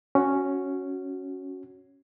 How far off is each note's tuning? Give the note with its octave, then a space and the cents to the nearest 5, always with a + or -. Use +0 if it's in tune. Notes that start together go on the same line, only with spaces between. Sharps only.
C#4 +0 F#4 +0